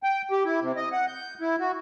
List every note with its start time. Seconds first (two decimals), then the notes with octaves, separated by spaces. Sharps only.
0.03 G5
0.31 G4
0.45 E4
0.62 C3
0.77 D#5
0.92 F#5
1.08 G6
1.41 E4
1.60 F#4